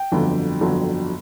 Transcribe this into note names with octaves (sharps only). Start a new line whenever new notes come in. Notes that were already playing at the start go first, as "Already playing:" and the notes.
Already playing: G5
G1 F2 D3 F#3
G1 F2 D3 F#3